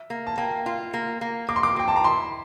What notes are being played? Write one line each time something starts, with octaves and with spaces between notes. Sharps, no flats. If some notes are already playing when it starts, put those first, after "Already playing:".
Already playing: E5
A#3
A5
A#3 G5
F4
A#3
A#3
A#3 D6
C6
D6
A#3 G5
A5
A#5
E4 C6